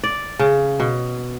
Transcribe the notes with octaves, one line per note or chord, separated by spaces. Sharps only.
D5
C#3
B2